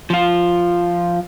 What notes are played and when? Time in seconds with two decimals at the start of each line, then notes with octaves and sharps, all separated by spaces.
0.10 F3 F4